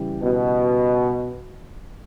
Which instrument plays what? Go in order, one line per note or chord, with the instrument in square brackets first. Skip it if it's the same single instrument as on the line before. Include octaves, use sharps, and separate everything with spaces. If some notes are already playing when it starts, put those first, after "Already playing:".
Already playing: [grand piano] C#3 E3 G3
[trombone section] B2